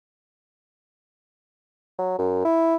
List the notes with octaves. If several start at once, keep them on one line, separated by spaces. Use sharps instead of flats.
F#3
F#2
E4